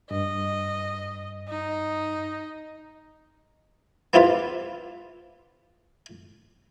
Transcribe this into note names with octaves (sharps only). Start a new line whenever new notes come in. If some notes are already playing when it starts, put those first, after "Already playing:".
G2 D#5
D#4
B3 C4 E4 F4 G4 B4